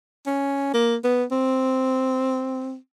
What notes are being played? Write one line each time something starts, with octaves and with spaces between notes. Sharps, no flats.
C#4
A#3
B3
C4